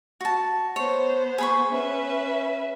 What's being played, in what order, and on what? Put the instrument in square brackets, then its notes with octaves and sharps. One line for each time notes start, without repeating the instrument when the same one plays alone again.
[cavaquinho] F#4 A5
[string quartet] B3 C5 [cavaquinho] C#5
[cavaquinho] G#4 B5 C#6
[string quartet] C#4 B4 E5